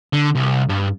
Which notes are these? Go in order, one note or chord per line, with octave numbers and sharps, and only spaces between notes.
D3
C2
G2